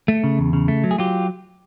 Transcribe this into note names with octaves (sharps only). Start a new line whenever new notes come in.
A3
C#3
E2
C#3
A3
F#3
G#4
F#3 F4 G4